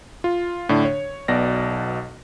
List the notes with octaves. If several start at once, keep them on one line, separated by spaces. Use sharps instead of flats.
F4
A2 D3 D4
C#5
B1 B2 D5 A#6